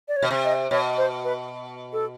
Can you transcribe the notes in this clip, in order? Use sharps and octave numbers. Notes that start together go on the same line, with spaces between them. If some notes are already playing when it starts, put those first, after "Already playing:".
D5
C#5
B2
C3
D#5
B2 C#5
C5
B4
A4